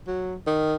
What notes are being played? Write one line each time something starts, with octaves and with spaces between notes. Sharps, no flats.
F#3
D#3